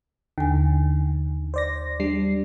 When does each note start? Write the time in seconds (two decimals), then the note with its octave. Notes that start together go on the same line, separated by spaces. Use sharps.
0.38 D#2 D3 G#5
1.54 C5 D5 A#6
2.00 G3 D4 C7